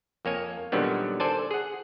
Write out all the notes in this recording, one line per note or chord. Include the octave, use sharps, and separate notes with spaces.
F2 A#3 C#5 G#5
A#2 D3 D#3 F#3 G3 B3
A4 C5 D5 G#5 A5
G#4 F#5